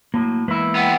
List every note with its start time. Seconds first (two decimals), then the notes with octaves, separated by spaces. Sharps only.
0.14 A2 F#3 A#3
0.48 E2 G#3 A#3 E4 B4
0.75 G3 B3